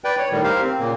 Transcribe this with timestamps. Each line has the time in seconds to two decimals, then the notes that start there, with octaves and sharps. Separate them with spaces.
0.04 B4 D5 G5
0.18 C#5
0.32 A2 D#3 G3
0.44 G4 A#4 C5 F5
0.62 C4
0.80 A#2 C#3 A#3